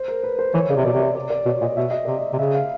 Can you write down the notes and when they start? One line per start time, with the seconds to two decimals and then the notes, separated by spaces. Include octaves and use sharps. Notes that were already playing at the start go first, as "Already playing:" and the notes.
Already playing: C5
0.08 A#4
0.23 B4
0.39 C5
0.54 E3 C#5
0.69 C#3 D5
0.77 C3
0.85 B2 D5
0.93 C3
1.00 D5
1.15 D5
1.30 D5
1.46 B2 C#5
1.61 A#2 D#5
1.77 B2 E5
1.91 D#5
2.05 C3 D5
2.19 D#5
2.33 C3
2.39 C#3 E5
2.55 F5